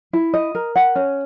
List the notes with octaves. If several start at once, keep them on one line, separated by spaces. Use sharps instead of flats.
E4
D#5
A#4
F#5
C#4